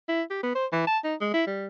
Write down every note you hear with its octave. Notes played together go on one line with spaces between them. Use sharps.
E4
G4
B3
C5
E3
A5
D#4
G#3
E4
G3